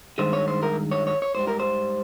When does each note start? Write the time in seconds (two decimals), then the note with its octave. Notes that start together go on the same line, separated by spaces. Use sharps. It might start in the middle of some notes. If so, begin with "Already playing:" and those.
0.18 G2 D#3 G#3 C5
0.33 C#5
0.48 C5
0.63 A#4
0.92 C#5
1.07 C#5
1.22 C#5
1.35 G#2 G3 C5
1.48 A#4
1.60 C5